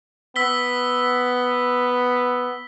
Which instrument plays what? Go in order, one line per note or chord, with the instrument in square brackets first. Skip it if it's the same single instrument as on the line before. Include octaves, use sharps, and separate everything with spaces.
[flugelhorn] B3 [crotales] E6 B6 G7